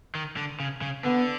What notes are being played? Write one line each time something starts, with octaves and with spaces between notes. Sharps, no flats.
D#3
D3
C#3
C#3
D3 B3